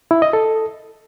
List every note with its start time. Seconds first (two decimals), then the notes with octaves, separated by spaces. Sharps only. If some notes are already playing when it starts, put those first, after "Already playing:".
0.11 E4
0.22 D#5
0.33 A4